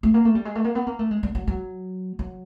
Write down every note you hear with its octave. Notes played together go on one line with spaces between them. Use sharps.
A3
A#3
A3
G3
G#3
A3
A#3
B3
A#3
A3
G#3
G3
F#3
F#3
F#3